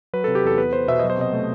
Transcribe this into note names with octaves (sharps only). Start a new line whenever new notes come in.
F#3 B4
C3 A4
G4
E2 A4
B3 B4
B3 C5
B2 E5
F#3 D#5
C5
C3 D#5
A3